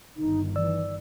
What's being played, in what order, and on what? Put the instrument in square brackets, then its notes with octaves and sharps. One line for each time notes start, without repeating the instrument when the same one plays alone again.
[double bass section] G1 D#3 [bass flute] D#4
[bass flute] E3 [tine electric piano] D5 E6